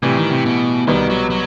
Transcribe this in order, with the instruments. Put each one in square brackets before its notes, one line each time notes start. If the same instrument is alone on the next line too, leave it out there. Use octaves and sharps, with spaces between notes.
[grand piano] A2 E3 G3 [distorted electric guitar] C3
[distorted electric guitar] D#3
C3
B2
[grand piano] C2 B2 G3 B3 [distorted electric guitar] D#3
[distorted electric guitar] F#3
F#3